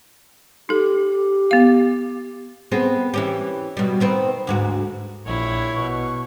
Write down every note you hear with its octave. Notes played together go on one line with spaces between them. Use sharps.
D#4 G4 A4
B3 F5
B3 C4 G#4
E3 C#4 G4
B2 G3
D#3 B3 C4
D2 G#2 F#4
A#1 E4 C#5
B2 C#6